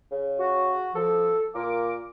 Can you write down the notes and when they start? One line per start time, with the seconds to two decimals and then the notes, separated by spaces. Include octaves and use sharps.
0.12 C#3
0.39 F#4
0.95 F3 A4
1.55 A#2 A#3 A#4 D6